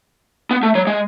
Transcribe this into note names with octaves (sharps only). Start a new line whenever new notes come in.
B3
A3
F#3
G#3